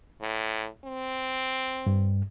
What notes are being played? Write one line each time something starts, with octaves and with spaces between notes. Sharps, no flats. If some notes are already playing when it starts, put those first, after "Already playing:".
A2
C4
G2